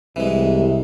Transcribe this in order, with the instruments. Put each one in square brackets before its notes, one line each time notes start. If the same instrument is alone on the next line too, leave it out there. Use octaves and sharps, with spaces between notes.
[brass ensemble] C2 [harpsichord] E3 G#3